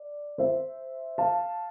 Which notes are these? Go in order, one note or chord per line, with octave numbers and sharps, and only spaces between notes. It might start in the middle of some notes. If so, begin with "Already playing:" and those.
Already playing: D5
C5 E5
F5 A5